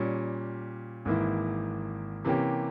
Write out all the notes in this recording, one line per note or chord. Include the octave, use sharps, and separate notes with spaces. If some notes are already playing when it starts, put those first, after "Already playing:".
Already playing: A#2 G3 C#4
G#1 G#2 E3 A#3 E4
C3 E3 A#3 C#4 G4